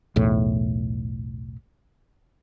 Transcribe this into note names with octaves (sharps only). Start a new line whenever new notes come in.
B1 E2 A2